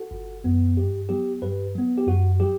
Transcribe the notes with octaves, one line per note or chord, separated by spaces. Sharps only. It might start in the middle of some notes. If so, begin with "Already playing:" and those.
Already playing: F#4 A4
G1
F#2 F#3 B3
G2 G4
F#3 B3 G4
G2 G4 B4
F#3 B3
G4
F#2 F#4
F#3 G4